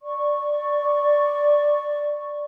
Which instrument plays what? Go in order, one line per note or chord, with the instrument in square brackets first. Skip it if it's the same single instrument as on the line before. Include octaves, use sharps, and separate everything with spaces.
[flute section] D5 C#6